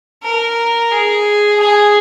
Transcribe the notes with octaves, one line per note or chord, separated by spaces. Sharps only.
A#4
G#4
G#4